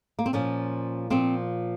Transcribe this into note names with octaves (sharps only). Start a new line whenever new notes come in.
A#3
C4
A#2 F3 C#4
A#2 F3 C4